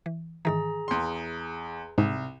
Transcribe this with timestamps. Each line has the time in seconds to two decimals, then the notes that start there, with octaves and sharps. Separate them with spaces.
0.06 E3
0.45 G#2 D#3 E3 G#4 A#5
0.88 E2 C6
1.98 C2 G#2